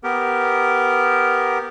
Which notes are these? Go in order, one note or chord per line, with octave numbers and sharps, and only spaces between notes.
B3 G4 A#4